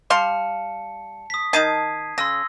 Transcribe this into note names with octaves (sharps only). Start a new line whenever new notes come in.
G3 F5 A5 C6 C#7
D#6 B6
D#3 D#4 A5 G#6 C7 D#7
C#3 C6 E6 A#6